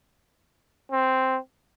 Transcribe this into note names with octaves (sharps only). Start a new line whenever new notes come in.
C4